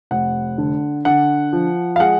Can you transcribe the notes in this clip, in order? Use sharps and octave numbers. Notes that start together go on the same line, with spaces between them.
F1 F#5
D3
D3 F#5
F3
F5
G#3 F#5